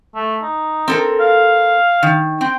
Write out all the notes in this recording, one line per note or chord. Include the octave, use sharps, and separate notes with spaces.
A3
D#4
C4 A4 A#4
F5
D#3
C4 G5